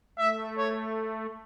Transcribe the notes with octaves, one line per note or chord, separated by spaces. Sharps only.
A3 E5
C#5